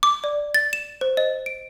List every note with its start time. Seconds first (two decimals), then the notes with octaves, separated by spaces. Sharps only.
0.03 D6
0.24 D5
0.54 A6
0.73 E7
1.01 C5
1.17 D#5
1.46 D7